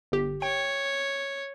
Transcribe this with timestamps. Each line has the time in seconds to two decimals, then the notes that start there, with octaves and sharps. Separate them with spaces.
0.12 G1 G4
0.42 C#5 G5